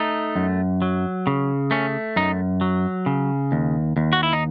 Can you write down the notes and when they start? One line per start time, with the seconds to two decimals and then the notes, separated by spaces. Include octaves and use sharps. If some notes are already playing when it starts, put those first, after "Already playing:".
Already playing: A3 D#4
0.36 F#2
0.82 F#3
1.27 C#3
1.71 A3 C#4
2.16 F#2 D#4
2.61 F#3
3.06 C#3
3.52 D#2
3.97 D#2
4.13 F#4
4.23 E4
4.33 D#4